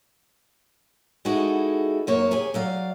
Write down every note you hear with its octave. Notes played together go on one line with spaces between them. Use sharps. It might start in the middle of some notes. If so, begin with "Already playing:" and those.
G#3 D#4 E4 F#4 G#4 A4
F#2 C3 A#3 A#4 C#5
G4 G#4 C#5 G#5
F#3 D5 F5